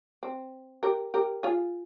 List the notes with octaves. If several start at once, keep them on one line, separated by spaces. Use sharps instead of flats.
C4
G4 A#4
G4 A#4
F4 G#4